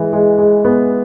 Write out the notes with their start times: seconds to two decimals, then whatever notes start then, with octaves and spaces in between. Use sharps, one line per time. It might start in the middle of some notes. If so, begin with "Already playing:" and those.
Already playing: E3 G#3
0.13 G#3
0.38 G#3
0.65 B3